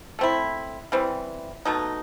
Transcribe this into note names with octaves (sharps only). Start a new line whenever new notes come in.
A3 C4 E4
E3 G3 C4
B2 A3 D#4